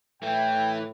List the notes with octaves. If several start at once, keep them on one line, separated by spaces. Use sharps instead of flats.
A2 E3 A3 G5